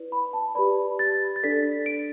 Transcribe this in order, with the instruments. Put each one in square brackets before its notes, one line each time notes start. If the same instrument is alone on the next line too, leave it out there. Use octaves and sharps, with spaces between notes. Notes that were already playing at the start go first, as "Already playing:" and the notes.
Already playing: [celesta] E4 B4 D5
B5
A5
G4 B4 D5 B5
A6
A6
D4 A4 D5 B6
D7